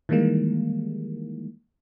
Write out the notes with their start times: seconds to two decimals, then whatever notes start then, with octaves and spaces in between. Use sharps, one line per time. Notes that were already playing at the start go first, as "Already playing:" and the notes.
0.09 D#3 E3 G3 G#3 A#3